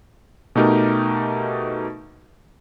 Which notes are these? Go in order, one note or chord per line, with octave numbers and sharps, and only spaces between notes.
B2 A3 D#4 G4 A#4